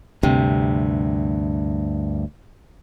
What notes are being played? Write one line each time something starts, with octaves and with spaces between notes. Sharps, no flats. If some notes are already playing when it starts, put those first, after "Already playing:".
D2 G2 C3